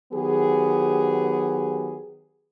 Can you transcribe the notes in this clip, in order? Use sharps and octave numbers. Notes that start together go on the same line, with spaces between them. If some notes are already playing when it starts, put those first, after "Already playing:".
D#3 F#3 B3 G4 G#4